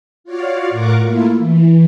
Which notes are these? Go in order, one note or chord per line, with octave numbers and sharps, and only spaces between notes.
F4 F#4 C#5 D5 F5
A2 F4 A#4 F#5 C#6 D6
A3 A#3 E4 F4
E3